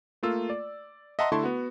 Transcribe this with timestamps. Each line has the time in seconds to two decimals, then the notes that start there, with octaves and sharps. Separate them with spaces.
0.23 A3 A#3 F4 E6
0.50 D5
1.19 D#5 E5 F#5 A5 A#5 C6
1.32 D3 A3 E4 A5 C6 C#6
1.44 B3 F#4